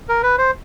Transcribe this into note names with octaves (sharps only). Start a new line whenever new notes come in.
A#4
B4
C5